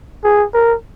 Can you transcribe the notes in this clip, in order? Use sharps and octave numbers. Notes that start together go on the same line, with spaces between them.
G#4
A#4